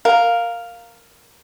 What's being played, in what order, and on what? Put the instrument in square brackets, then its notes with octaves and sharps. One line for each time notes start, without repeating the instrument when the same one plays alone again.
[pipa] A#4 [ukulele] F5